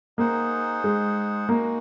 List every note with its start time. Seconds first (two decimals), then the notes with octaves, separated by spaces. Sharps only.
0.18 A#3 D#4 G#4 C5 F#5
0.84 G#3
1.49 G#3 A#3 D#4 F#4